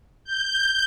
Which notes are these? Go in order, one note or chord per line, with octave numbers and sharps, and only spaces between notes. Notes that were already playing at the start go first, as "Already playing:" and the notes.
G6